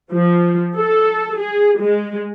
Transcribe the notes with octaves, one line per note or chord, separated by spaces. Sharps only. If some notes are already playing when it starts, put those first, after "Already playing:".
F3
A4
G#4
G#3